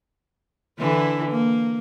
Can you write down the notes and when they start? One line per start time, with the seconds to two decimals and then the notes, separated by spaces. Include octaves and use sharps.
0.79 D3 E3 E4
1.31 A#3